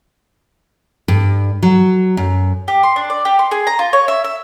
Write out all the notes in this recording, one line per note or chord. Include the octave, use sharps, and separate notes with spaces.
G2
F#3
F#2
G4
C6
D4
D5
G4
C6
G#4
A#5
F4
C#5
E5
E5